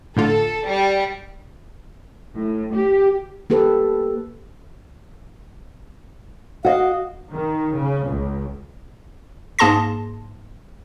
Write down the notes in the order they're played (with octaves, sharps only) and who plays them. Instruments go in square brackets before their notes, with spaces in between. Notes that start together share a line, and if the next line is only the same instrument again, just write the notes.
[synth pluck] A2 D3 F4 [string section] A4
[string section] G3
[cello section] A2
G4
[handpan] A#3 G4 A4 B4
[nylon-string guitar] F#4 D#5 [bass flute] F5
[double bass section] D#3
C#3
C#2
[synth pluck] G#2 A#3 G#4 A5 C6 A#6